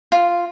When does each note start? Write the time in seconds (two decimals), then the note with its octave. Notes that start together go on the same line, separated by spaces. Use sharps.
0.12 F4